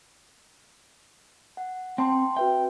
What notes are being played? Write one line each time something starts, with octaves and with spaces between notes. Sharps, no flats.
F#5
C4 G5 A5 C6
F#4 B4 E5 G5